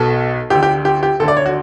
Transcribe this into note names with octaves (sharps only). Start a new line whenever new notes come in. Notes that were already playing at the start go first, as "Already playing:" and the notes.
Already playing: B1 B2 A4
D2 D3 G4
G4
G4
G4
D2 D3 A4 D5
C#5
F#4